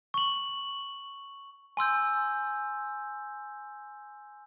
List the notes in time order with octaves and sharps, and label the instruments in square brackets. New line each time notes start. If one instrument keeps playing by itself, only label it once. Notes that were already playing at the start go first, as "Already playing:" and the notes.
[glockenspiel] C#6 F#7
G#5 C6 E6 G6